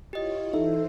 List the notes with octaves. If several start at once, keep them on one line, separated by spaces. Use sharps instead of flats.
E4 F4 G4 C#5 D#5
E3 D#4 A4 C5 E5